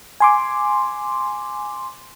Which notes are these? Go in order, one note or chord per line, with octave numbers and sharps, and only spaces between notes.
G#5 C6 D6